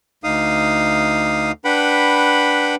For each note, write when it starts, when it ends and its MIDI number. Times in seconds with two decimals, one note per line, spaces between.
0.24 1.52 38
0.24 1.52 63
0.24 1.52 77
0.24 1.52 87
1.65 2.75 62
1.65 2.75 71
1.65 2.75 78
1.65 2.75 79
1.65 2.75 83